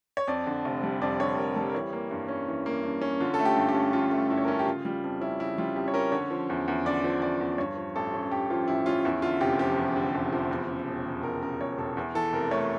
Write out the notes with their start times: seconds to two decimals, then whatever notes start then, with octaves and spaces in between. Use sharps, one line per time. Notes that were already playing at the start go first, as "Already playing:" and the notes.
0.17 C#5
0.28 F2 D5
0.47 D3
0.65 F1
0.83 G3
1.01 F2 D5
1.19 D3 C#5
1.37 F1 A#4
1.56 G3 A4
1.70 A#4
1.75 E3 C#5
1.93 A#3
2.11 G2
2.28 C#4
2.48 E3
2.66 A#3
2.83 G2
3.01 C#4
3.20 D3 F4
3.34 A4
3.39 A3
3.45 G4
3.57 G2
3.69 G4
3.75 C#4
3.93 D3 F4
4.11 A3
4.29 G2 E4
4.38 C#5
4.45 A#4
4.48 C#4 A4
4.59 G4
4.66 C#3 F4
4.85 G3 F4
5.03 F2
5.21 C#4 E4
5.40 C#3 E4
5.58 G3 F4
5.76 F2 G4
5.88 C#5
5.94 C#4 A#4
6.12 D3 C#5
6.31 F3
6.50 E2
6.68 E2
6.85 D3 D5
7.04 F3
7.21 E2 D5
7.41 E2
7.58 G2 C#5
7.77 F3
7.96 A1 A4
8.14 C#4
8.31 G2 G4
8.50 F3 F4
8.68 A1 E4
8.86 C#4 F4
9.05 E2 E4
9.22 D3 F4
9.41 F1 G4
9.59 F3 G4
9.77 E2
9.96 D3
10.15 F1
10.33 F3
10.51 E2
10.69 C#3
10.88 E1
11.05 E1
11.23 E2 A#4
11.41 C#3 A#4
11.61 E1 C#5
11.78 E1 A4
11.97 E2
12.15 E3 A4
12.33 F1 A#4
12.51 A3 C#5